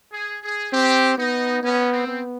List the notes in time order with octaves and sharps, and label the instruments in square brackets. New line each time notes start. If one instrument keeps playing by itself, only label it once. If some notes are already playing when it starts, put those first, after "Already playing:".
[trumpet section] G#4
G#4
[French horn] C4 [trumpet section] G4
[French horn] B3 [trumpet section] D#4
[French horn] B3 [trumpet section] C#4
[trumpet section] C4
[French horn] B3